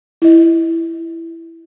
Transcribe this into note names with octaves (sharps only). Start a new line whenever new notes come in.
E4 D#5